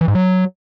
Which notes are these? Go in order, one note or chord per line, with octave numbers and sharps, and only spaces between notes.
E3
G#2
F#3